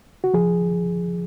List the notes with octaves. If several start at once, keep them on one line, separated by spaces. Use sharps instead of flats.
F#4
F3 G#4